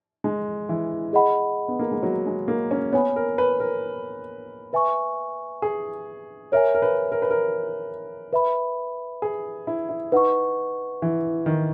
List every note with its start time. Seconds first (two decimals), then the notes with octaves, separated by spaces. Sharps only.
0.24 G#3
0.69 E3
1.13 G#4 D#5 F#5 B5
1.68 B3
1.79 A#3
1.92 G#3
2.03 F#3
2.26 G#3
2.48 A#3
2.71 C#4
2.93 B3 C#5 G#5 B5
3.16 A#4
3.38 B4
3.60 A#4
4.73 B4 E5 G#5 C#6
5.62 G#4
6.52 A#4 C#5 E5 G#5
6.75 A#4
6.82 B4
7.12 A#4
7.22 B4
7.31 A#4
8.33 B4 E5 B5
9.22 G#4
9.67 E4
9.89 E4
10.12 D#4 B4 F#5 C#6
11.02 E3
11.46 D#3